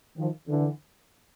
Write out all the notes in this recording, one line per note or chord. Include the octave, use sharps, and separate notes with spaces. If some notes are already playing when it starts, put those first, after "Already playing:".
D#3 F3
D3 E3